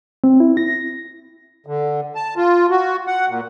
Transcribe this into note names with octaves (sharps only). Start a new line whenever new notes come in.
C4
E4
A#6
D3
A5
F4
F#4
F#5
A#2